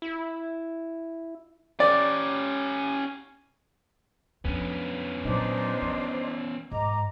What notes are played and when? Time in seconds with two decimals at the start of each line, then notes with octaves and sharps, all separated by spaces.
0.02 E4
1.80 C#4 G4 D5
4.45 F2 B3 C#4 D4
5.25 A#2 F#3 D4 D#4 C5
5.82 E3
6.72 G#2 D#5 A#5 D6